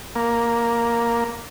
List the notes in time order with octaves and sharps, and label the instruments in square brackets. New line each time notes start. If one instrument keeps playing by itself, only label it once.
[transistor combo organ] A#3